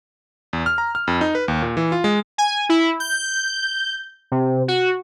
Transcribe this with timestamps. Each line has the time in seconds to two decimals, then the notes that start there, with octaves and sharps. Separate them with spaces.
0.53 E2
0.66 F6
0.78 A#5
0.95 F6
1.07 F2
1.21 D#4
1.35 B4
1.48 D#2
1.62 A#2
1.77 E3
1.92 F4
2.04 G#3
2.38 G#5
2.69 E4
3.00 G6
4.31 C3
4.68 F#4